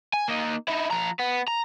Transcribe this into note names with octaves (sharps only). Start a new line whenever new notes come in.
G#5
A#3 D#4
D#4 E4
F3 A#5
B3
A#5